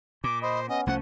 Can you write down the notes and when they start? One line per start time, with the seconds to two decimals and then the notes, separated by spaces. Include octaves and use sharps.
0.24 A#2 D6
0.42 C5 D#5 B5 D#6
0.69 B3 C#4 D#5
0.87 C2 F3 A3 C#4 F#5